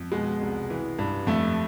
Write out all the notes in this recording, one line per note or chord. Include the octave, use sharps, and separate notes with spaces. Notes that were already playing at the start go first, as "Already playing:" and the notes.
Already playing: F2
B2 G#3
C2
E3
G2
F2 A3